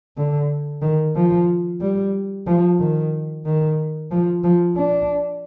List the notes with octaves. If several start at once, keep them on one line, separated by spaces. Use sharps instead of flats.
D3
D#3
F3
G3
F3
D#3
D#3
F3
F3
D4